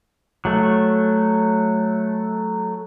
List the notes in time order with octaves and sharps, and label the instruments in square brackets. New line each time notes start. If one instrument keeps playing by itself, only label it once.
[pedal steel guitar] F#3 A3